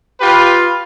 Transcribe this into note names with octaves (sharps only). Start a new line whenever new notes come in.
F4 G4 B4